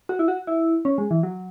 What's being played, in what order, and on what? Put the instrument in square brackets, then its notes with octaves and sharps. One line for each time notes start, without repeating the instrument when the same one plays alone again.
[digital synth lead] F#4
E4
F#4
E4
C#4
G#3
E3
F#3